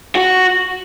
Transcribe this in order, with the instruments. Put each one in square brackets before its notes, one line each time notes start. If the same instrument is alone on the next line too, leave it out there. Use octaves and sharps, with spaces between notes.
[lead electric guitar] F#4